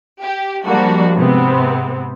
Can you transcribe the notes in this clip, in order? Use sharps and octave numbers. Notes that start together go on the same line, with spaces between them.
G4
F3 G3 G#3 A#3 D4 F#4
G#2 C3 B3 C4